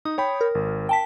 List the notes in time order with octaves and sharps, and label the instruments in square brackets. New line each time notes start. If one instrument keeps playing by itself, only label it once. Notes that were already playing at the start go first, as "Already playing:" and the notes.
[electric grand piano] D#4 [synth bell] D#6
[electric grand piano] C#5 G5 B5
[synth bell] A#4
[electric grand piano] G#1
[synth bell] G5 A5 B6